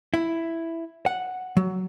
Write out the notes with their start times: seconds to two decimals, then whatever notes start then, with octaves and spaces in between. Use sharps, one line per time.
0.14 E4
1.06 F#5
1.57 F#3